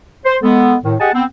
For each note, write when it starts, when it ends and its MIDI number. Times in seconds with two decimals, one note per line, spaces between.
0.25 0.37 72
0.42 0.75 56
0.42 0.75 59
0.42 0.75 69
0.84 0.94 45
0.84 0.94 51
1.00 1.11 67
1.00 1.11 68
1.00 1.11 75
1.00 1.11 78
1.00 1.11 80
1.00 1.11 81
1.13 1.24 59
1.13 1.24 60